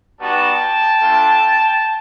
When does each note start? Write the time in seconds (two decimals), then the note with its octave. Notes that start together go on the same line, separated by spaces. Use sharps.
0.19 G3 B3 D#4 F#4 G5 A5
1.00 A3 D4 F4